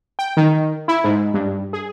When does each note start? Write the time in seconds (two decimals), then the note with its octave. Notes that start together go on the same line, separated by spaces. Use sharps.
0.19 G5
0.37 D#3
0.88 E4
1.04 G#2
1.34 G2
1.73 G#4